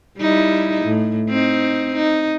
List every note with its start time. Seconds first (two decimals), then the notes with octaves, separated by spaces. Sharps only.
0.19 G3 D#4 E4
0.85 A2
1.30 C4 D#4
1.96 D#4